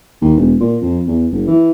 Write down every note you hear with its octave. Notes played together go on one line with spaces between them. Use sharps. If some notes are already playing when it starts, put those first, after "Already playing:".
D#2
E1
A#2
F2
E2
F#1
E3